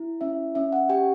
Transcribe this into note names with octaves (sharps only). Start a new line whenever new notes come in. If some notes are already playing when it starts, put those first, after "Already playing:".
Already playing: E4
C#4 E5
C#4 E5
F#5
G4 G5